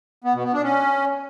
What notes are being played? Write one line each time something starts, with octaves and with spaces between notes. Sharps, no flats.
B3
B2
B3
D4
C#4